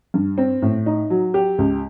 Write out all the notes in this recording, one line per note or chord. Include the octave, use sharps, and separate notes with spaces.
G2
C4
A2
D#4
F#3
G4
C#2